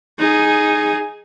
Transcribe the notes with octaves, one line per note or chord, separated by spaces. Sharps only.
D#4 G#4